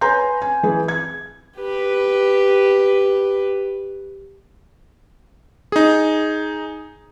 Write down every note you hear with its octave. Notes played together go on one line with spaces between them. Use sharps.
B4 C#5 G#5 A#5 C6 G6
G#5
E3 G#4 B4
G#6
G4 B4
D#4 G#4